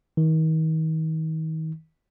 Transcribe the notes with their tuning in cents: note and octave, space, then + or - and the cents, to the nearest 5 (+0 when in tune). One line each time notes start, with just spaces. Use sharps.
D#3 +35